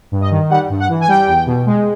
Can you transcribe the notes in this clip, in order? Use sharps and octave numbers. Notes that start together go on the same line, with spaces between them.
G2
D#5
D#3
G3 F#5
G2
F#5
E3
G#5
G3 G5
E2
B2
G#3